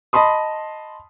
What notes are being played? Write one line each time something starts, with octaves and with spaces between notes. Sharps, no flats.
D#5 A5 B5 C6 D#6